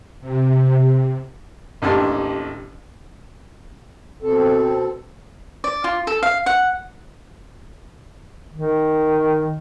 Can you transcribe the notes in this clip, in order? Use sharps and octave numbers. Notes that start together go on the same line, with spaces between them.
C3
A1 D#2 D4 G4 A5 C6
B2 C4 A4
D5
F4
A4
F5
F#5
D#3